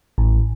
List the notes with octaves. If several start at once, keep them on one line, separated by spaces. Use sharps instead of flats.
A1